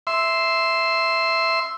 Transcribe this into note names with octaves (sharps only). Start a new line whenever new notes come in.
E5 C6